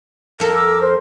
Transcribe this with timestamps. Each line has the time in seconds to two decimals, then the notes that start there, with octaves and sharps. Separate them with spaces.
0.40 F2 A4 A#4
0.55 D6 E6
0.82 C5